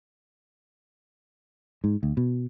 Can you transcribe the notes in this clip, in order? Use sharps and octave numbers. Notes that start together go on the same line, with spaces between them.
G#2
D2
B2